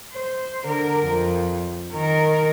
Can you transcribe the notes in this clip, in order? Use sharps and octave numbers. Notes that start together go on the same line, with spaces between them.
C5
D3 A#4
F2
D#3 A#4